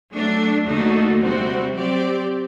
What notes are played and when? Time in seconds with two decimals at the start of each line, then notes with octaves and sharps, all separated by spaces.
0.14 F#3 A3 D4
0.68 D#2 D3 A3 D#4 F#4
1.23 C3 G3 C4 F#4 C5
1.77 F#3 C4 G4 D5